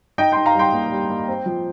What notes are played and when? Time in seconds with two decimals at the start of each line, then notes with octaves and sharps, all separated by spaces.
0.18 D#4 D#5 G5
0.32 D#4 G5 C6
0.46 F5 A#5
0.55 G3 G5 C6
0.73 A#3
0.91 G3
1.10 A#3
1.28 C4
1.46 F3